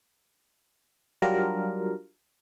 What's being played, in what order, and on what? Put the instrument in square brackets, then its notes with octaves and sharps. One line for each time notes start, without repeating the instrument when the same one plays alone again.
[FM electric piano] F#3 G3 D4 F4 A#4